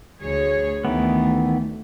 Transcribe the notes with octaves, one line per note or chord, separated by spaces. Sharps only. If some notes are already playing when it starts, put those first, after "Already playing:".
D2 G#4 C#5
D2 D#3 E3 A3 B3